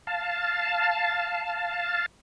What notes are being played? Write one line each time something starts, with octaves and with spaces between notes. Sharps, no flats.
F5 A5